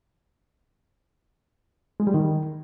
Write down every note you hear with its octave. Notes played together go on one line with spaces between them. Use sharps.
G#3
G3
D#3